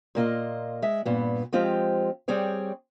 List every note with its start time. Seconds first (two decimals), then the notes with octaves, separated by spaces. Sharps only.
0.15 A#2 A#3 F4 D#5
0.82 G#3 E5
1.05 G2 A#2 B3
1.53 F3 G#3 C4 F4 G4
2.28 G3 C4 G#4 C#5 D5